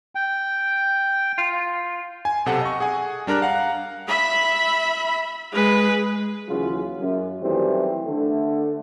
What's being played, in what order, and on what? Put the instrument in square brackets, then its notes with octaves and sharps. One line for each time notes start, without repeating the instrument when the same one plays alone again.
[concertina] G5
[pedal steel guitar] F4
[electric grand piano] G#5
B1 C3 A4 F#5
D#5 C#6
G#4 F#5 G#5
G3 D4 A#4 A#5 F#6
F5 F#5 A#5
[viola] E5 B5
G#3 B4
[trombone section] D#2 C#3 E3 F#3 F4 G#4
F#2
D#3 E3 F#3 G3 A3 C4
D3 A3